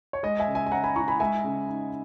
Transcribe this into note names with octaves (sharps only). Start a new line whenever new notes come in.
C#5
G#3 D#5
E5 G#5
C#3
E5 G#5
G#5
C#4 F#5 A#5
G#5 B5
E4 A#5 C#6
G#5 B5
G#3 E5 G#5
C#3
D#4